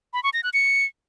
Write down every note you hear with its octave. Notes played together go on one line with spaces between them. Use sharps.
B5
C#6
A#6
F#6
C#7